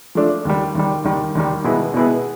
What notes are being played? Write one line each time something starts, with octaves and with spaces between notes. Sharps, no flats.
F3 A3 D4 F4
D#2 D#3 G3
D#2 D#3 G3
D#2 D#3 G3
D#2 D#3 G3
B2 G#3 B3 E4 G#4
B2 G#3 B3 E4 G#4